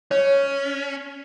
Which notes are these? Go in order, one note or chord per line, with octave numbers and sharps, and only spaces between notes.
C#4 C#5